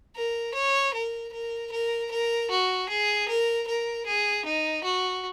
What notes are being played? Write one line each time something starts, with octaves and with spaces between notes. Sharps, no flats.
A#4
C#5
A#4
A#4
A#4
A#4
F#4
G#4
A#4
A#4
G#4
D#4
F#4